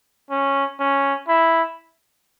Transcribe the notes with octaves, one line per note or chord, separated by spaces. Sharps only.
C#4
C#4
E4